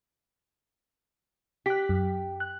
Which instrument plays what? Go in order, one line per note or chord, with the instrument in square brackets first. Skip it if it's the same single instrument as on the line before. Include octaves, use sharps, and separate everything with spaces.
[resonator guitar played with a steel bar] G4 [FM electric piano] F#6 B6
[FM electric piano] F#2
F#6